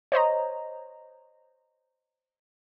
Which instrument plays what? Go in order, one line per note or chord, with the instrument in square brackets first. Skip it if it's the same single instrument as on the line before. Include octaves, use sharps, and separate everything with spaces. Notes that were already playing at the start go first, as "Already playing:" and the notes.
[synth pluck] C5 C#5 D#5 A#5